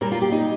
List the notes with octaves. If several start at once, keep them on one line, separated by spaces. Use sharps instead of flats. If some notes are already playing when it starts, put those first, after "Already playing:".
A#2 G3 A#3 A#4
F4
G4
D#4